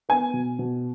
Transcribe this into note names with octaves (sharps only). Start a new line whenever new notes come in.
B3 G#5
B2
B2